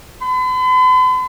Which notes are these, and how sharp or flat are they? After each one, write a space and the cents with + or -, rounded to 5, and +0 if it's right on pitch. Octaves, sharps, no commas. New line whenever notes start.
B5 +45